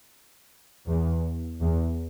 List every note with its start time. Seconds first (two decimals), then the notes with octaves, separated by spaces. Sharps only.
0.87 E2
1.61 E2